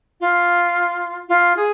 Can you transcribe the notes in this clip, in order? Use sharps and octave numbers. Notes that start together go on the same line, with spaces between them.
F4
F4
G#4